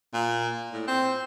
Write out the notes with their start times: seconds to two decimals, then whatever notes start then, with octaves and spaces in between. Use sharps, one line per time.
0.14 A#2
0.73 A2
0.88 C4